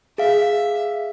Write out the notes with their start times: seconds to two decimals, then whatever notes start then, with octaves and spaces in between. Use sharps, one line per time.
0.18 G#4 E5 F5